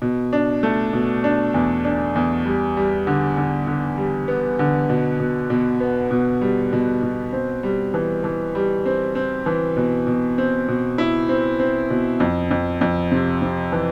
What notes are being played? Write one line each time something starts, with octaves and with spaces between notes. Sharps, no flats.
B2
D4
A3
B2
D4
E2
D4
E2
G3
G3
D3
D3
D3
G3
B3
D3
B2
B2
B2
B3
B2
G3
B2
B2
C4
G3
E3
E3
G3
C4
C4
E3
B2
B2
C4
B2
E4
C4
C4
B2
F2
F2
F2
C3
C3
E3